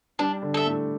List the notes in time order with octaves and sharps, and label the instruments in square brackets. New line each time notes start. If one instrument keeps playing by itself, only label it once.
[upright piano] G3 G4 [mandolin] D4
[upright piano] D3 D4
[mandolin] A4 E5
[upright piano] A2 A3